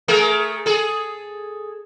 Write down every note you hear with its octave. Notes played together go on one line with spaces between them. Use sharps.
A3 G#4 A#4
G#4 A4